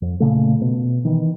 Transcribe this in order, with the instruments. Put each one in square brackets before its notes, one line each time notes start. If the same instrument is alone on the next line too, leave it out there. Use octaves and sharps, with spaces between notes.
[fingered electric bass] F2
A#2 C#3 A3
B2
D#3 E3